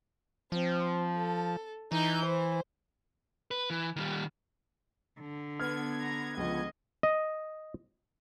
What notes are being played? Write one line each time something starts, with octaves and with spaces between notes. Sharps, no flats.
F3 C4
A4
E3 D#4 G6
C5
B4
E3
D#3 G3
D3
B3 F6 G#6
A#5
C#2 F3 D#5
D#5